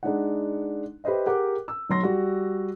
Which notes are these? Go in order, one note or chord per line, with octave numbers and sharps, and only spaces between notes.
G#3 D4 D#4 F#5
G4 B4 C5 D#5 E5
G4 G#4 A#4 F#5 D6 F#6
E6
B1 F#3 C6 A#6
G3 F#4 G4